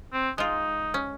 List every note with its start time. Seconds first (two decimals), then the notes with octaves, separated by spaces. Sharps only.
0.13 C4
0.38 G#3 D#4 F4
0.94 C#4